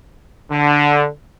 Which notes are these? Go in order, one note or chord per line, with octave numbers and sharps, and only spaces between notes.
D3